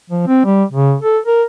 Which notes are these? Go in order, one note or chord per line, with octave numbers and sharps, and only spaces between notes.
F3
C4
G3
C#3
A4
A#4